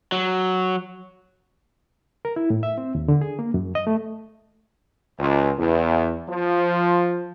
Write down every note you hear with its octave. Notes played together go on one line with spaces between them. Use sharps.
F#3
A#4
E4
A2
E5
C4
D#2
D3
G#4
A#3
F#2
D#5
A3
C#2
E2
F3